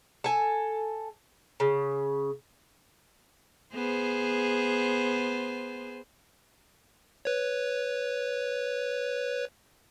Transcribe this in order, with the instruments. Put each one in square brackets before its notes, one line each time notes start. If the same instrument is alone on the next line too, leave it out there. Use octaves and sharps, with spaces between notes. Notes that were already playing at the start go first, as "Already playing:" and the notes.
[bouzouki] A4 G#5
C#3
[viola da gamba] B3 G#4 C5
[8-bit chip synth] B4 C#5